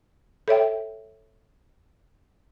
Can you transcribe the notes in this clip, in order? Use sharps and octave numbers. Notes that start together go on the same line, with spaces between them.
A4 C#5 E5 G5